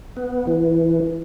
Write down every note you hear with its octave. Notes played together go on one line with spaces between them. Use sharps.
B3
E3